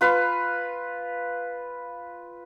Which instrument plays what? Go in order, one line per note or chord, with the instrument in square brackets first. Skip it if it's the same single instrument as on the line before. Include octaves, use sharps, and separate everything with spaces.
[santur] F4 B4 F5